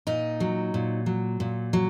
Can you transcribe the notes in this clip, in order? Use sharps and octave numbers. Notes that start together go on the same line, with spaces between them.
A#2 D#4
F#3
A#2
F#3
A#2
F#3